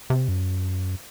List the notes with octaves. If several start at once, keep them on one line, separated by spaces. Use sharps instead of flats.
C3
F#2